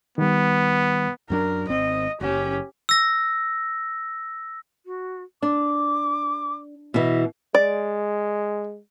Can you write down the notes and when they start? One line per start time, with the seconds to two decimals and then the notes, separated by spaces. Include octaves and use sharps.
0.18 D#3 G3 B3
1.30 F#2 F#3 D4 A#4
1.69 G#1 C4 D#5
2.21 F#1 C#4 G4
2.89 E6 A#6
4.86 F#4
5.42 D4 D6
6.94 B2 E3 D#5
7.55 G#3 D5